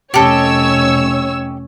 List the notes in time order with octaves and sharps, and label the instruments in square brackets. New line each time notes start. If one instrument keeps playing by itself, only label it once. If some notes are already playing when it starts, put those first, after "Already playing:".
[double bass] F1 C#4 [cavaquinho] G4 A4 D#5 [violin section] C#5 E6